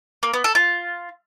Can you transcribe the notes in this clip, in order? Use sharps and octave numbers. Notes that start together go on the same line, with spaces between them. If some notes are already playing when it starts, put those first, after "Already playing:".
A#3
B3
A4
F4